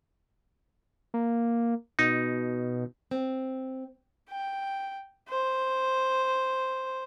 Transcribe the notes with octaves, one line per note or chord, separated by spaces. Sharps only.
A#3
B2 D#4
C4
G5
C5